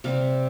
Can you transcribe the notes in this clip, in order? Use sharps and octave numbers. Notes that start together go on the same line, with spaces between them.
C3 G3 C4 F5